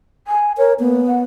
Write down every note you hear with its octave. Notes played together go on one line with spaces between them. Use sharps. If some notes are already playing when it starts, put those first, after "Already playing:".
G#5
A#4 C#5
A#3 B3
F#5